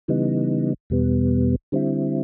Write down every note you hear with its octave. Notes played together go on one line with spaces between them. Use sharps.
C#3 E3 G3 B3 D#4
E2 B2 G3 B3
D3 G3 C4 E4